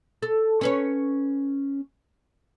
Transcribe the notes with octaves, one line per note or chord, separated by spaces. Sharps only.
A4
C#4 B4 C#5